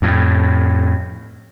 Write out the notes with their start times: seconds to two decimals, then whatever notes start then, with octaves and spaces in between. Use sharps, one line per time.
0.02 F2 A2